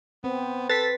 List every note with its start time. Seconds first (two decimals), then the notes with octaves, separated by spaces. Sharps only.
0.24 B3 C4
0.69 A4 B4 A6 B6